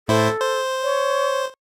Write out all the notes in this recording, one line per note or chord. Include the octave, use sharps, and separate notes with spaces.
A2 E4 A4 C5
C5
C#5